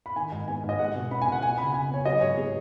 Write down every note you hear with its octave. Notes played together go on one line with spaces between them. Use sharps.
B5
D#3 G#5
G#2
B3 G#5
G#2
D#5
G#3 F#5
B2
C#4 B5
G#5
B2
F#5
B3 G#5
C#3 B5
C#3 G#5
B3 C#5
F#3 D#5
G#2 C#5
B3 G#4